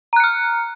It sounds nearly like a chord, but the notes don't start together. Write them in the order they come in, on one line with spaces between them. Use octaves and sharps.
A#5 F#6 C#7 F6